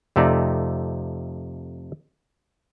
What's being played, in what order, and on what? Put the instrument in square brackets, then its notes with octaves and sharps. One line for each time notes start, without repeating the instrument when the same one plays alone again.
[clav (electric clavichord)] F2 C3 A3 D#4 D5